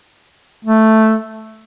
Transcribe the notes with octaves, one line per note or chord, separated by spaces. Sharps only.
A3